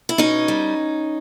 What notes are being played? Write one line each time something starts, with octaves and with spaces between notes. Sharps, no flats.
E4
B2 C#4 D#4
G3